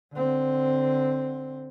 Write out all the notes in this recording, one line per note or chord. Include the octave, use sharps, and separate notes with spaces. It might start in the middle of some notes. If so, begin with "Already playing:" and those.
D3 C4